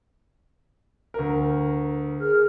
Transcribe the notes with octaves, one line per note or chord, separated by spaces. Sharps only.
D2 A#4
G#4 A#4 F6